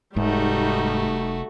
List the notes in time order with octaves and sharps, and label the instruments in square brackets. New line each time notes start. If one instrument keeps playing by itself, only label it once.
[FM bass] F1 [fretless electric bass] G#2 [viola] G3 D#4 [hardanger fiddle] A3 F#4